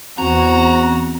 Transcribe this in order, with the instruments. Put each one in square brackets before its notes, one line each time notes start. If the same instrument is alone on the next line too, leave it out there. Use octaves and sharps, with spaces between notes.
[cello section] E2 [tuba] C4 [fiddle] F#4 [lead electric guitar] A#5